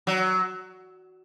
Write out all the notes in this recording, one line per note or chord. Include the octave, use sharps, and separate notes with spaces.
F#3